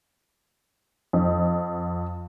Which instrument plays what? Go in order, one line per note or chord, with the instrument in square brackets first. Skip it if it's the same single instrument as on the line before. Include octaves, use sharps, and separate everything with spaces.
[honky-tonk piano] F2